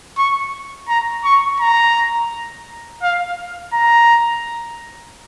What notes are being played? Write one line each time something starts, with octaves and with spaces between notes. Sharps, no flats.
C#6
A#5
C#6
A#5
F5
A#5